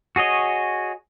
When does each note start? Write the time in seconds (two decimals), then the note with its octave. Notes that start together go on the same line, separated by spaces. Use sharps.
0.16 F#4 G#4 C#5 D#5